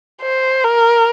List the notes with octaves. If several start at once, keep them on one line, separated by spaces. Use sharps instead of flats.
C5
A#4